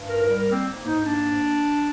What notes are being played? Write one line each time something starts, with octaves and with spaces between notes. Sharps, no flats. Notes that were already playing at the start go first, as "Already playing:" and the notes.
Already playing: G2
G#2 A#4
A#4
G3
A#4
A#3 C4
G#2
G#2 D#4
A#3 D4